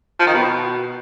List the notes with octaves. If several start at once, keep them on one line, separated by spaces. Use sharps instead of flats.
F3
D#3
B2